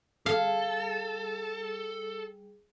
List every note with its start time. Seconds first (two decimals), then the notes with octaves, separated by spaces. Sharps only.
0.26 G3 G#4 A4 F5